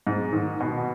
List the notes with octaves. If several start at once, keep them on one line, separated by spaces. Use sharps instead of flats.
G#2
D#3
B2